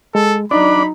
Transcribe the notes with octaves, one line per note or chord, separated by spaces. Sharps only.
G#3 A4
F#3 D4 D#4 D5 D#5 B5